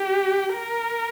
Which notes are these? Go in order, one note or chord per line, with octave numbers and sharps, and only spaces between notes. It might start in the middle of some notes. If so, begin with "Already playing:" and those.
Already playing: G4
A#4